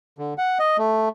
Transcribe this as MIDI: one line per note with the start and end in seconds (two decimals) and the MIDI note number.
0.18 0.34 50
0.38 0.58 78
0.59 0.77 75
0.78 1.09 57